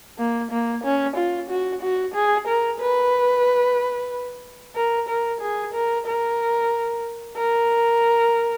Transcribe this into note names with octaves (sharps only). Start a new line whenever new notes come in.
A#3
A#3
C#4
F4
F#4
F#4
G#4
A#4
B4
A#4
A#4
G#4
A#4
A#4
A#4